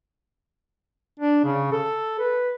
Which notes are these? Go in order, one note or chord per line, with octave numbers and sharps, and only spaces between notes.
D4
C#3
A4
B4